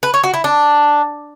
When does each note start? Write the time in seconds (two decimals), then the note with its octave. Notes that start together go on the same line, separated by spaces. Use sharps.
0.03 B4
0.14 C#5
0.24 F#4
0.34 E4
0.44 D4